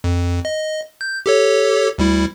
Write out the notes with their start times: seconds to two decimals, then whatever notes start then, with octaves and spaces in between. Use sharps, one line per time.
0.04 F2
0.45 D#5
1.01 G6
1.26 G4 A4 C#5
1.98 D2 G3 E4